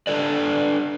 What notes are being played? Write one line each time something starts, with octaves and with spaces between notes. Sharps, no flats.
D4 A4 B4 D5